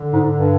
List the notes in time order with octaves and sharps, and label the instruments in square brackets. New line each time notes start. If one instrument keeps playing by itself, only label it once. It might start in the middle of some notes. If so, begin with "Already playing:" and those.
Already playing: [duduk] D3
[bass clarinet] G#2
G2